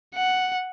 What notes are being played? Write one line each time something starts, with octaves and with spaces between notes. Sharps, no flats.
F#5